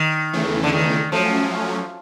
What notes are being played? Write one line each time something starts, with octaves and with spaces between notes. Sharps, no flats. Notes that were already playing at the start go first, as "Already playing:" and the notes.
Already playing: D#3
E2 C#3 E3 A3
D3
D#3
F3 F#3 A3 C#4